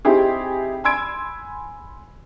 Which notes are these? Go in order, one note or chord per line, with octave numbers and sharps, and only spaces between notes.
C4 D#4 E4 G4 G#4
G#5 B5 C6 E6 G#6 D7